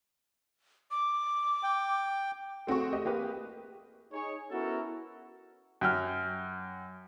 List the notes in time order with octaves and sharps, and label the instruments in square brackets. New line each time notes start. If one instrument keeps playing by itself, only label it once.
[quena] D6
[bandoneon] G5
[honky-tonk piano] A3 C4 F#4 G#4 C#6
A3 G4 D#5
A#3 G4 G#4 B4
[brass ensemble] D#4 G#4 C#5
B3 C#4 E4 F#4 A4 A#4
[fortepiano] F#2 G5 F6